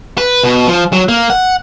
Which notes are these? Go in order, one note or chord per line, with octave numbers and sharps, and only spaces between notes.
B4
B2
F3
F#3
A#3
F#5